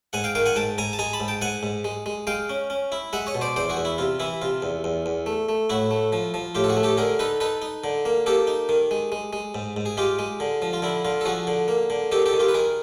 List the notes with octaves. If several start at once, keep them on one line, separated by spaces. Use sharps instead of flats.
G#2 F#5 G#5
F5 G5
D#3 F5 G5
F#5 G#5
G#2 G5 A5
G#2 G#5 A#5
A5
G#3 G#5 A#5
A5 B5
G#2
G5 A5
G#2 F#5 G#5
G#2
G#3
G#3
G#3 F5 G5
C#4
C#4
E4
G#3 E5 F#5
C#5 D#5
B2
C5 D5
E2 C5 D5
F#4 G#4
E2
E4
C3 F4
E3 E4
C3 F4
E2
E2
E2
A3
A3
A2 E4 F#4
A3
F3
F3
A2 F4 G4
A4
F#4 G#4
A3
G4 A4
D3 G#4 A#4
D#4 A4 B4
D#4 A4 B4
D#4
D3
A#3
A#3 G4 A4
D#4
D#3
G#3
G#3
G#3
G#2
G#2
G#4
G#3 F4 G4
G#3
D3
F3
F4
D3 E4
D3 F4
A4
F3 F#4 G#4
D3
A#3
D3
D#3 G4 A4
G4 A4
D#3
F4 G4
B4
D#3 G#4 A#4